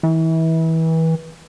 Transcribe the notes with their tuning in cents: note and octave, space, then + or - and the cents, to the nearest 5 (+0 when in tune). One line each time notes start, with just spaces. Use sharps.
E3 -30